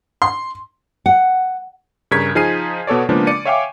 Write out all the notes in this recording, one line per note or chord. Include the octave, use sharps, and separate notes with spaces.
C6
F#5
G2 C#3 A#4 C#6 G#6 B6
F3 D#4 G#4 F6 C7 D#7
B2 B3 A4 C#5 D5
C#3 F3 G#3 A#3 B3 D4
D5 C#7 D#7
C#5 E5 F5 G5 G#5 D6